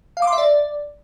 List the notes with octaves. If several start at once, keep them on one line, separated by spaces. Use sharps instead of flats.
F5
D6
C6
E5
D5